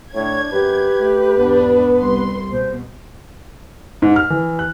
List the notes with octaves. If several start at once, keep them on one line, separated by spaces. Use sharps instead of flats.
A2 D4 C#5 G#6
F#2 G4 B4
A3
E2 G#2 B3 D4
C2 C6
B2 C5
G#2
F6
E3
F#6